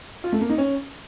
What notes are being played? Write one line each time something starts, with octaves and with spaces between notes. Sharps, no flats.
F4
A3
A#3
D#4
C#4